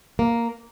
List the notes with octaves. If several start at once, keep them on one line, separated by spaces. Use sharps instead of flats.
A#3